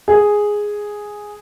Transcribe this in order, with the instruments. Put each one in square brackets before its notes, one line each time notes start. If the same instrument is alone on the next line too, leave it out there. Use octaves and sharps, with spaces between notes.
[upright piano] G#4